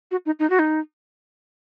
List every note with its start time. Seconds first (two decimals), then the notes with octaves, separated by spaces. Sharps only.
0.11 F#4
0.26 D#4
0.39 D#4
0.50 F#4
0.59 D#4